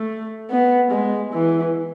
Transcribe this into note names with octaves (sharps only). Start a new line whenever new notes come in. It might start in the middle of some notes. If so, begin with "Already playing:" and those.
Already playing: A3
B3
G#3
E3